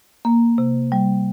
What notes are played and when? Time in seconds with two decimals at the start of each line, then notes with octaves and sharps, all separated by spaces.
0.25 A#3
0.58 C3
0.92 G3